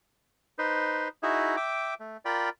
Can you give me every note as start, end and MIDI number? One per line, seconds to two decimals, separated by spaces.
0.59 1.08 63
0.59 1.08 71
0.59 1.08 72
1.23 1.56 63
1.23 1.56 64
1.23 1.56 66
1.23 1.56 68
1.23 1.56 76
1.57 1.94 76
1.57 1.94 79
1.57 1.94 86
2.00 2.17 57
2.25 2.49 65
2.25 2.49 70
2.25 2.49 74
2.25 2.49 79
2.25 2.49 83